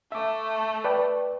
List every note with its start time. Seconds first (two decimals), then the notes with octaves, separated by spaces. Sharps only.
0.12 A3 E5 D6
0.84 B4 D5 G5